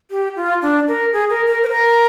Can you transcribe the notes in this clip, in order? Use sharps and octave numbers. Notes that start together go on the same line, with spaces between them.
G4
F4
D4
A#4
G#4
A#4
A#4
C5
A#4